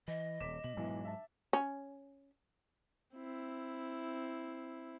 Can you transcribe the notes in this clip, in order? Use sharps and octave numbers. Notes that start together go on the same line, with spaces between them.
E3 D#5
D#1 D6 B6 E7
B2 F#7
B1 G#2 E3 F#3 G#3
E5 A5
C#4
C4 E4